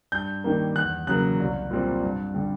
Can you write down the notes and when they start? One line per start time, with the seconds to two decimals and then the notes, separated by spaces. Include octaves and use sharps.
0.12 G2 G6
0.44 D#3 G3 A#3
0.76 E2 F#6
1.07 C#3 F#3 A#3 F#6
1.39 C2
1.71 A#2 G3 C4
2.03 G2
2.34 D3 G3